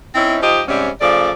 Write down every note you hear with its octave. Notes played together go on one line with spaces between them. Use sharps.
C4 C#4 D#4 E4
F3 D#4 G4 C5 D#5
G#2 C3 G3 C4 C#4
C#3 F3 A3 D5